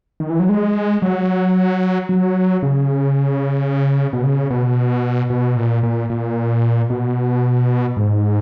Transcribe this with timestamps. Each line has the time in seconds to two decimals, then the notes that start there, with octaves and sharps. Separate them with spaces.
0.20 D#3
0.30 E3
0.40 F#3
0.49 G#3
1.02 F#3
2.09 F#3
2.63 C#3
4.13 B2
4.24 C#3
4.50 B2
5.30 B2
5.56 A#2
5.83 A#2
6.10 A#2
6.90 B2
7.97 G#2